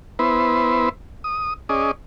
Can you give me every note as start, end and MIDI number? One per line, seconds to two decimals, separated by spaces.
0.19 0.89 59
0.19 0.89 64
0.19 0.89 71
0.19 0.89 72
1.24 1.54 87
1.69 1.91 61
1.69 1.91 68
1.69 1.91 74
1.69 1.91 75